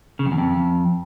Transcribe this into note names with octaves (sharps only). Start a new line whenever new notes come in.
C#3
F2
E2
F2